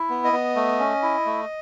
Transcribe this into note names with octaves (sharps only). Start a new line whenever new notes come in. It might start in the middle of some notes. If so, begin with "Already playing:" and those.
Already playing: E4
B3
D#5
B3
A3
C#4
E4
A3